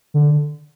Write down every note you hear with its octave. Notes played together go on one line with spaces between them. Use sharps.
D3